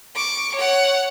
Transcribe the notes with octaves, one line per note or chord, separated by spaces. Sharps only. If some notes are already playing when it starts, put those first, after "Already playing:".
C#6 D6
C#5 F#5